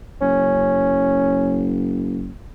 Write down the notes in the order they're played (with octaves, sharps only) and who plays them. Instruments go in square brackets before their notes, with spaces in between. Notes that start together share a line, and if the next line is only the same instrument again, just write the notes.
[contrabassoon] F#1 [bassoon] C#4